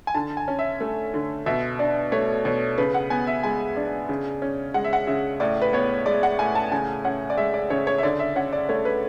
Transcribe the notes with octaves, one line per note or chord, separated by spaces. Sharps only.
G#5
D3 A5
G#5
C#4
E5
A3
D3
B2 E5
D4 D5
A3 C#5
B2 C#5
C#3 B4
F#5
B3 G#5
E5
G#3 G#5
D4
C#3
C#4
G#3 F#5
E5
F#5
C#3 E5
A2 D5
B4
B3 C#5
G#3 D5
F#5
A2 G#5
A5
C#3 G#5
C#4 F#5
D5
G#3 E5
D5
C#3 C#5
C#5
E5
D3 D5
E5
C#4 F#5
D5
A3 C#5
B4